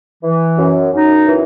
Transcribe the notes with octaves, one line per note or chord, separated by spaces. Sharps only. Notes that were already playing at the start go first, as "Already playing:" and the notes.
E3
F#2
F#2 D#4
E3